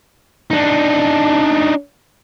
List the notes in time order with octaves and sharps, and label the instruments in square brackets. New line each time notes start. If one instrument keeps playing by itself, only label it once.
[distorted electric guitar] D4 D#4